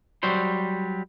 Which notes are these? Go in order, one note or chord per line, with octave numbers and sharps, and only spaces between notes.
F#3 G3 C5